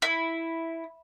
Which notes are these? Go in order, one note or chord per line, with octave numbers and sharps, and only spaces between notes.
E4